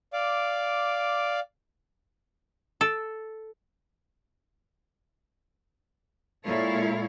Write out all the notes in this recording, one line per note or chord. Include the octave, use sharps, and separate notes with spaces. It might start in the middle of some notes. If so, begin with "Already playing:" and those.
D5 F5 D6
A4
A#2 G#3 E4 A4 C#5 F5